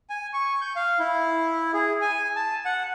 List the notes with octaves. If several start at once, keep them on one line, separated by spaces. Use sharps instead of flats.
G#5
C#6
G6
F5
E4
G#4
G#5
A5
F#5